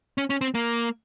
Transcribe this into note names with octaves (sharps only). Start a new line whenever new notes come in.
C#4
C#4
C4
A#3